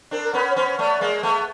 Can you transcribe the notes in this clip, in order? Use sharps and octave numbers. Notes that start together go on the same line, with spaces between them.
C4 D4 A#4
A#4
B3 C#4 B4
C#5
B3 C#4 C5
A3 B3 D5
G#3 A#3
A3 B3